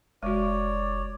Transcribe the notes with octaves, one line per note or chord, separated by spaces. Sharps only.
F1 G#3 F#4 C#5 D5